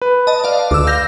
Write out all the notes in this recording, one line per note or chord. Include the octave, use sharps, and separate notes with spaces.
B4
D#5 A5
D5 F5
D2 D6 E6
F5 G6 A#6